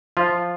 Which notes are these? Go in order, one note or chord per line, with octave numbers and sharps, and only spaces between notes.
F3 F4